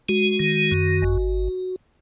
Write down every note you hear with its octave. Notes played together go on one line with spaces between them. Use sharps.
G#3 F#4
D#3
F#2
G#1